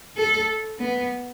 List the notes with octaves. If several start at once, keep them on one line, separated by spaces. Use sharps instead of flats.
A4
B3